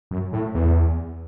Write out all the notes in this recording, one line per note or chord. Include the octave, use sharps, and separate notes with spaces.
F#2
A2
E2